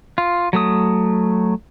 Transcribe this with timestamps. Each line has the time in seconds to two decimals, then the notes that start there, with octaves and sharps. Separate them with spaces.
0.18 F4
0.53 F#3 A3 D#6